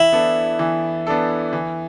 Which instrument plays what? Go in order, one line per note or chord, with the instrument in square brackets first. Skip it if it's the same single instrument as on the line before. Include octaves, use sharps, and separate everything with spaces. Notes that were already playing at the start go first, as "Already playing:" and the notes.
Already playing: [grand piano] E3 [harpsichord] E4
[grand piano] B3 D4 A4
E3
B3 D4 A4
E3